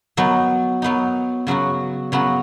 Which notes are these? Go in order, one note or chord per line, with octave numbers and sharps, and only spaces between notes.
F#3 B3 D#4
F#3 B3 D#4
C#3 F#3 B3 F#4
C#3 F#3 B3 F#4